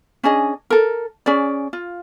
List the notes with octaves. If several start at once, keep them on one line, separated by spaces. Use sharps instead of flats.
C#4 D4 G#4 D#5
A4 A#4
C#4 G#4 D5
F4